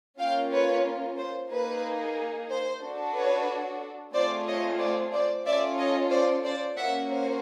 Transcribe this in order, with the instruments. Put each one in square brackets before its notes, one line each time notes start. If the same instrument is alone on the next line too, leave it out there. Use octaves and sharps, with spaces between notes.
[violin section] A#3 C#4 F4 F5 G5
B4 C#5
C5
A#3 D#4 G#4 B4
C5
D4 F#4 A4
B4 C#5
A3 C4 F4 G#4 C5 D5
C#5 D#5
C5 D5
C5 D5
C#4 F4 A4 D5 E5
C#5 D#5
C5 D5
C5 D5
A#3 C#4 F#4 E5 F#5
C5